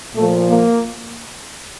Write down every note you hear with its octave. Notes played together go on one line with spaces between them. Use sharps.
A#2 F3 A3
A#3